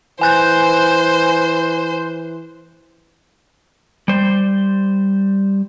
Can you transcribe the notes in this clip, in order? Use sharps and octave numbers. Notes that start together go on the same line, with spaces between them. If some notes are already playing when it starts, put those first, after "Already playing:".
E3 C5 G#5 F#6 G6
G3 C5